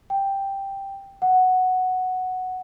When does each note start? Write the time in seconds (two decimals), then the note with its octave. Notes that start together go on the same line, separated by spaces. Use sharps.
0.10 G5
1.22 F#5